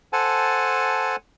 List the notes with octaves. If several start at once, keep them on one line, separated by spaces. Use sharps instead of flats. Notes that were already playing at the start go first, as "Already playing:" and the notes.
A4 C5 F#5 G#5 A5